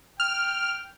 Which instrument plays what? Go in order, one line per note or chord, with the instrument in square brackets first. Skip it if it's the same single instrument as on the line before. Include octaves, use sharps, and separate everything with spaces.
[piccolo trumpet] G5 [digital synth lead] F6